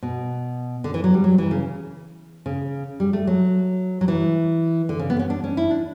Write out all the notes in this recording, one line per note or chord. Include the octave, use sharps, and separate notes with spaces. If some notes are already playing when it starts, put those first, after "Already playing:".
B2
D3
E3
F#3
G3
F#3
E3
C#3
C#3
G3
A3
F#3
F#3
E3
D3
C#3
B3
C#4
D4
C#4
E4
D4